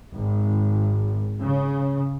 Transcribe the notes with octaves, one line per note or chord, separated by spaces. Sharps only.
G#1
C#3